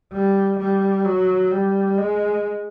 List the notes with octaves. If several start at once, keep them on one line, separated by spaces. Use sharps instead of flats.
G3
G3
F#3
G3
G#3